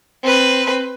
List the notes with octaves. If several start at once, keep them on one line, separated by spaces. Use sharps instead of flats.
C4 B4